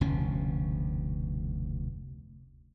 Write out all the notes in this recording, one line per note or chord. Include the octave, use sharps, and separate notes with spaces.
F1 D2 B2 C#4